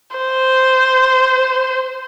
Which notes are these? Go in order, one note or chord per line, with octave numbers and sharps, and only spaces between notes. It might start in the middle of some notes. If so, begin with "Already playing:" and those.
C5